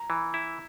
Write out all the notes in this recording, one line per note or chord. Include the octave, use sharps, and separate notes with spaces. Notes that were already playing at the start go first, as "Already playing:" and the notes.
Already playing: A#5
E3
E4